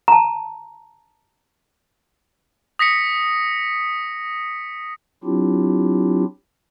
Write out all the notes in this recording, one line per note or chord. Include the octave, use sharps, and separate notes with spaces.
A5 A#5
D#6 A#6 B6 C#7
F#3 C4 D4 E4 F4 G4